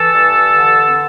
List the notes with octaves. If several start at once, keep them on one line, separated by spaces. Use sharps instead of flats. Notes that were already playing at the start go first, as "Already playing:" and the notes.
Already playing: E3 A4 A5
G2
D3
C4